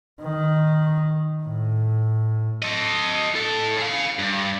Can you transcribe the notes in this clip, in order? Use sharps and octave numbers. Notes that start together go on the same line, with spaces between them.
D#3
A2
A4 D#5
A2 A4
G#4 F5
G2